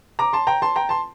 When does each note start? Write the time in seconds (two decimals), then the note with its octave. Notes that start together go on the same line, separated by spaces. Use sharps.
0.19 A#5 D6
0.33 A5 C6
0.47 G5 A#5
0.62 A5 C6
0.76 G5 A#5
0.89 A5 C6